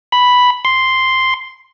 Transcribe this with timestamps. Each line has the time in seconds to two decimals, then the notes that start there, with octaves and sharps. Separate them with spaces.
0.12 B5
0.65 C6